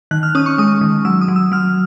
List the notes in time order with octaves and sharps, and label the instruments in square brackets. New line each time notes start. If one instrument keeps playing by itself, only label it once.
[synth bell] D#3 F#6
F6
C#4 D#6
C#6
G#3 D#6
D#3
F#3 E6
D#6
F#3
E6
F#3 F6